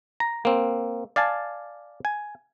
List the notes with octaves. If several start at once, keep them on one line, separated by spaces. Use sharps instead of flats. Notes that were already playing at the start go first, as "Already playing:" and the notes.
A#5
A#3 C4
D5 F5 G#5 A5
G#5